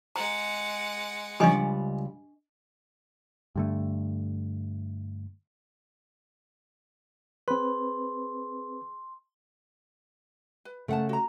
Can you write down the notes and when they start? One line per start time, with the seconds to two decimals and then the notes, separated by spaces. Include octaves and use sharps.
0.16 G#3 F#5 A#5
1.40 C#2 F3 G3 C#4 D4 D#5 G#5
3.56 G2 D3 A3
7.48 C4 G#4 B4 C6
10.65 B4
10.88 C#3 A3 A#4 F#5 A5
11.09 F#4 A#5